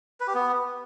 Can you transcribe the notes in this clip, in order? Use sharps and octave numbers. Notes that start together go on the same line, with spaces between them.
B4
G4
B3